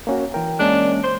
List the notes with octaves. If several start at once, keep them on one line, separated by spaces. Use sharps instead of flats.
A#3 C#4 F#4
E3 A#4 G5
G#3 A#3 C#4 D4
C5